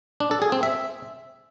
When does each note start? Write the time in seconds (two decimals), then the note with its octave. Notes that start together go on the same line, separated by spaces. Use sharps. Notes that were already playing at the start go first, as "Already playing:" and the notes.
0.20 D4
0.31 A4
0.42 G#4
0.52 C4
0.63 E5